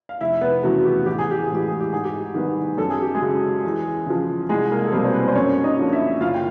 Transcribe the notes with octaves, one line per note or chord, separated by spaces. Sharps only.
F5
F1 E4 E5
B3 B4
E2 C#3 F#3 A3 F#4
G4
A1 G4
G#4
G4
G#4
A2 E3 G#3 G4
G#4
G4
G#2 G#4
G4
D#3 G3 B3
F#2 A4
G#4
G4
G#3 G#4
C#3 F#3
E2
C#3 F3
C2 G#3 G#4
A#3 A#4
A4
B2 G3 A#3 C4 A#4
C5
B3 B4
C5
F#2 C#4 C#5
D#4 D#5
D3 F3 A#3 D4
E4 E5
F#1 F4 F5
G5